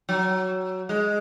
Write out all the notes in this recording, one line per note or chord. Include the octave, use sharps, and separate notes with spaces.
F#3
G#3